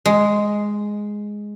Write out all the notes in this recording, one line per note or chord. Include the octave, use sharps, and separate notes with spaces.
G#3